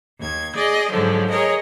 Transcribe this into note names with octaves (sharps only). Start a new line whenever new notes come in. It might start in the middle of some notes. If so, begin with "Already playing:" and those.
D#2 G#6
G#4 D5 D#5
G#2 D3 F3 F#3
G#4 A#4 C#5 D#5